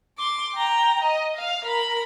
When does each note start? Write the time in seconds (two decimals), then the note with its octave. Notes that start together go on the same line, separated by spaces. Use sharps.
0.18 C6 D6
0.55 G5 A#5
1.02 D#5
1.36 F5
1.65 A#4 B5